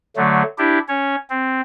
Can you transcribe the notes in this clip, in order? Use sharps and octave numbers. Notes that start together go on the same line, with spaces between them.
D3 F#3 A3
D4 E4 G4
C#4 C#5
C4